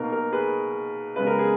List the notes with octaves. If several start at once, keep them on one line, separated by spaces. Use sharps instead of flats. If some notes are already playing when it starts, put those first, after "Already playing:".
Already playing: B2 A#3 D#4 A#4
A#4
G#4 B4
C#3 G#3 B3 B4
A#4
G#4